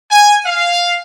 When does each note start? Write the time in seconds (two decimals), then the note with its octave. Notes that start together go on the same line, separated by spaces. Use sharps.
0.10 G#5
0.46 F5